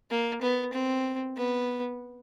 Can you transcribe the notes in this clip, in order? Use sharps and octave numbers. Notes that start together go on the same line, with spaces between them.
A#3
B3
C4
B3